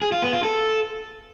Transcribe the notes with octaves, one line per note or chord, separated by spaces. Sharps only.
G#4
F4
B3
F4
A4